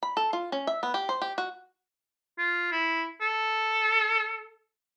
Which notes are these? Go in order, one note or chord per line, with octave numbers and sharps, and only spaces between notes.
B5
A4
F4
C#4
E5
B3
G4
C5
G4
F#4
F4
E4
A4